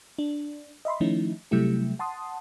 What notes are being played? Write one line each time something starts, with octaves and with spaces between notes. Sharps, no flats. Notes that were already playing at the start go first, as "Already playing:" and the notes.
D4
D#5 E5 B5 C6
D#3 F3 A3 C#4 D#4 E4
C3 F#3 G3 A3 E4 G4
F#5 A5 C6 D#6